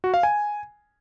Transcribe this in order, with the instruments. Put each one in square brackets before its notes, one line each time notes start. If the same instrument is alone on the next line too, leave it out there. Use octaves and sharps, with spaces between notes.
[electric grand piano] F#4
F5
G#5